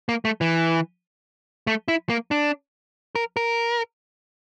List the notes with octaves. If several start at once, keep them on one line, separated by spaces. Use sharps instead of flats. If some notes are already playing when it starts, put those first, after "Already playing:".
A#3
A3
E3
A3
E4
A#3
D4
A#4
A#4